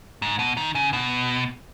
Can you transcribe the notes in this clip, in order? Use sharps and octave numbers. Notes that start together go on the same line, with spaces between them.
G#2
B2
D#3
C#3
B2